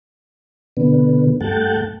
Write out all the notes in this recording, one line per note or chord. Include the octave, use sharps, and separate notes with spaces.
B2 D3 B3
G2 A3 F#5 G5 A5